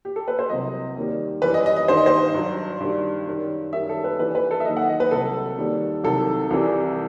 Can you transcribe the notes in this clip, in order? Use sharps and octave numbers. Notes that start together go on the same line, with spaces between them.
G4
A4
B4
C5
C2 C3 F#3 D#5
D#2 D#3 G3
F#2 E3 G3 B4
D#5
D#5
D#5
G2 D#3 G3 C5
D#5
C5
G2 F#3
G2 D#3 G3
F#2 D#3 G3
F#2 D#3 G3 E5
A4
B4
G2 E3 G3 B4
B4
A4
E5
D#2 D#3 F#3 D#5
F#5
D#5
B4
C2 C3 F#3 A4
D#2 D#3 G3
C2 C3 D#3 F#3 A4
C2 C3 E3 G3